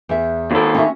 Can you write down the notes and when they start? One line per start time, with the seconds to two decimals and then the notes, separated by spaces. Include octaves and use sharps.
0.09 E2 E5
0.51 D#2 A4
0.75 C#4 F#4 E5